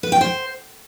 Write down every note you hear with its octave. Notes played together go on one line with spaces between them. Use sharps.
B4
G5
C5